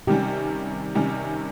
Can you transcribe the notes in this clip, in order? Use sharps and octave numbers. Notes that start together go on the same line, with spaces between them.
C3 D#3 G3 C#4 G4
C3 D#3 G3 C#4